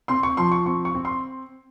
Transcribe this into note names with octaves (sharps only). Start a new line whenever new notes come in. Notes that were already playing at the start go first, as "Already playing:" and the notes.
C4 C6
C#6
F3 C6
C#6
C4 C#6
C#6
C4
C6